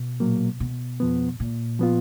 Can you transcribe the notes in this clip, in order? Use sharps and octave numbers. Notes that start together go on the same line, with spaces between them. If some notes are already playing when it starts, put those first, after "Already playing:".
Already playing: B2
A#2 F#3 A#3
B2
F2 F3 B3
A#2
F3 B3 F4